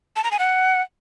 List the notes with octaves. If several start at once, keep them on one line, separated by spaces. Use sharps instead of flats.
A5
A#5
G#5
F#5